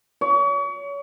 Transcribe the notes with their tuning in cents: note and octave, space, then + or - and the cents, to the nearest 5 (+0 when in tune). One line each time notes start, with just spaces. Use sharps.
C#5 +35